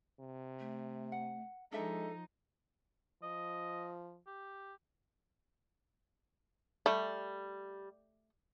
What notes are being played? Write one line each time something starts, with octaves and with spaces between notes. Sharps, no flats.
C3
A3
F#5
F3 G#3 D4 D#4 A4 E5
F3 D#5
G4
G3 A3